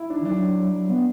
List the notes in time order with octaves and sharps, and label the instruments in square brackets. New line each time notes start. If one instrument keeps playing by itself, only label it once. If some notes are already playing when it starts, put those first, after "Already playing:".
Already playing: [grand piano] E4
D4
[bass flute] E3
[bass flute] F#3 [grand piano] D4
[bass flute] F#3
B3